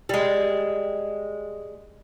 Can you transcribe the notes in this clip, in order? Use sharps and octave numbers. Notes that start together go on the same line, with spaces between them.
G3 G#3